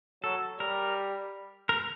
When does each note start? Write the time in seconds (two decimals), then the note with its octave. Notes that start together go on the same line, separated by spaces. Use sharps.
0.23 F#3 A4
0.60 G3 A#4
1.69 A#4